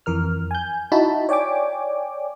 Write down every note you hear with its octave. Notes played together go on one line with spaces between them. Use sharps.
F2 E3 A#4 F6
G#5 G6
D#4 E4 F#4 A5 B5
C#5 D5 G5 G#5 D6